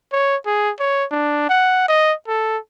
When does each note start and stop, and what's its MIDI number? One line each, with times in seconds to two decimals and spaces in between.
0.12 0.36 73
0.46 0.71 68
0.80 1.05 73
1.11 1.48 62
1.49 1.86 78
1.88 2.13 75
2.28 2.58 69